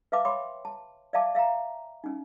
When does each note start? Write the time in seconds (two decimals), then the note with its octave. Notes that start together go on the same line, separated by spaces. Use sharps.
0.12 B4 E5 F5 A5 D6
0.25 C#5 G5 B5 C6 D6
0.65 A5
1.13 D5 E5 F5 A5 D6
1.35 E5 F5 G5 A#5
2.04 C#4 D#4